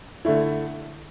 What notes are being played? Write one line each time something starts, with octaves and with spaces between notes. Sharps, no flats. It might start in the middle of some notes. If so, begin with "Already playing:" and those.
D3 A3 E4